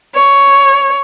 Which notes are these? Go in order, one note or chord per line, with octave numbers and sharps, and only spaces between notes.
C#5